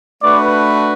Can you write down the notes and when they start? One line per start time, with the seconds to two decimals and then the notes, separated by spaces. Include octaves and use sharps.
0.23 A3 D4 F#4 B4 D5